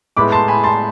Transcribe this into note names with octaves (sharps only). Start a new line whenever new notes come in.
A2 G#3 B3 B5 D6
A5 C6
G#5 B5
A5 C6